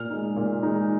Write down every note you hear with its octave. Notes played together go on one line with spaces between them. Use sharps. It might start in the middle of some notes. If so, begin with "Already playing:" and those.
Already playing: A#2 F6
G#3 D#4
A#2
G#3 D#4